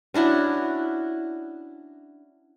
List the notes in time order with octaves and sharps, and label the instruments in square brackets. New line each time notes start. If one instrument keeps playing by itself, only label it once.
[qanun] C#4 D4 E4 F#4